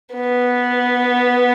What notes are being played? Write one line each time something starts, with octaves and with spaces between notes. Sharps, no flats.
B3